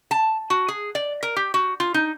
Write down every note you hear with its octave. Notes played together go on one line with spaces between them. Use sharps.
A5
F#4
G#4
D5
A#4
G4
F#4
F4
D#4